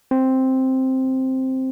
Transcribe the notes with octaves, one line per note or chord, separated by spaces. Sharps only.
C4